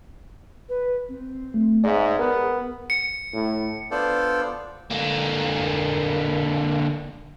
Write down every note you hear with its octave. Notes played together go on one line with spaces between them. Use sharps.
B4
C4
A3
G#2 G#4 D5 E5
B3 A#4 F#5
C#7
A2
B3 D4 F4 A4 C5 D5
D3 A#3